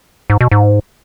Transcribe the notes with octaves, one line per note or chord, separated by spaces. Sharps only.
G#2
B2
G#2